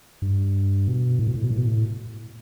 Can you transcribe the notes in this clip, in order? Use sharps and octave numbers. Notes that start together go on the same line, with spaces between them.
G2
B2
A2
B2
A2
B2
A2
B2
A2